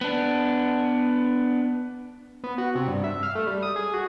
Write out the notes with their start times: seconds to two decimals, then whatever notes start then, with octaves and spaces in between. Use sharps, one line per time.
0.01 B3 D4
2.44 B3
2.58 F#4
2.75 C3
2.88 G2
3.04 E5
3.23 F5
3.35 A3
3.47 G3
3.63 D#6
3.76 G#4
3.94 F#4